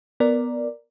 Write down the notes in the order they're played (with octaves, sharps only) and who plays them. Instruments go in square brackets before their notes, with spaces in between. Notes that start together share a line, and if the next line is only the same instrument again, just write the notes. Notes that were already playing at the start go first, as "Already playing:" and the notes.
[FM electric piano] B3 A#4 D5